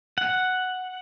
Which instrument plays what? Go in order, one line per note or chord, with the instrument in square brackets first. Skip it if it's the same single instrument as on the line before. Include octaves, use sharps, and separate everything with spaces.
[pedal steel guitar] F#5